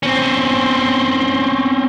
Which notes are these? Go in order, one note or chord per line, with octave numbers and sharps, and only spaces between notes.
C4 C#4